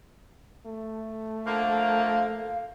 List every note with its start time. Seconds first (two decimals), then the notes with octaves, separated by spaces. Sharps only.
0.67 A3
1.46 D3 F3 A#3 F5